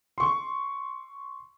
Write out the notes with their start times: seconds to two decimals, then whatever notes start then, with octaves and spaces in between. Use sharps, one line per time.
0.18 C6 C#6